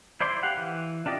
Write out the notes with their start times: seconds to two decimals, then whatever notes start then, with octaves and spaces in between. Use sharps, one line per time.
0.21 E4 C5 D5 C6
0.43 G4 F5 F#5
0.57 E3
1.06 D4 F4 G4 D5 D#5